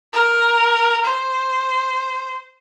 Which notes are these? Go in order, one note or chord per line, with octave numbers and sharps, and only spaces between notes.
A#4
C5